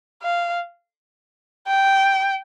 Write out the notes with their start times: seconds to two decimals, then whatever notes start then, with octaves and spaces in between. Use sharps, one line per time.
0.23 F5
1.67 G5